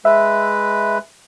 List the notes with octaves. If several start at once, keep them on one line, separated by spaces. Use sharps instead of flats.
G#3 B4 E5